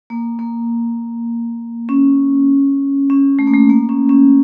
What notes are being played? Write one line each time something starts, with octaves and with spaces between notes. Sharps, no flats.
A#3
A#3
C#4
C#4
A3
A#3
A3
A#3
C#4
C#4